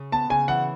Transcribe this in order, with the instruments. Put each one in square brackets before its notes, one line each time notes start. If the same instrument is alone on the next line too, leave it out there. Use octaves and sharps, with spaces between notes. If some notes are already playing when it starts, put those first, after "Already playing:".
Already playing: [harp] C#3
[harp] B3 [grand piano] A5
[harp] C#3 [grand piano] G#5
[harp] E3 [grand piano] F#5